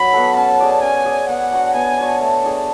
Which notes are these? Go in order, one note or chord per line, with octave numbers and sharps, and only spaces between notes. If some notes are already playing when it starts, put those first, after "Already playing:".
Already playing: F#3 B5
B3 F#4 A4
C#4 A5
G#4 D5
C#4 G#5
G#4 D5
B3 F#5
D4 F#4 C#5
B3 G#5
D4 F#4 C#5
A3 A5
D4 G#4